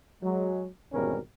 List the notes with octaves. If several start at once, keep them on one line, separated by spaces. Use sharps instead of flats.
F#3 G#3
G#1 E2 B2 G3 C#4 A#4